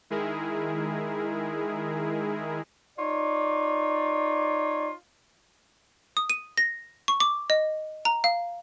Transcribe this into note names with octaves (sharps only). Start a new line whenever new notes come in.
D#3 G#3 E4 G#4 A#4
D#4 F4 C#5 D5
D#6
D#7
A#6
C#6
D6
D#5
A#5
F5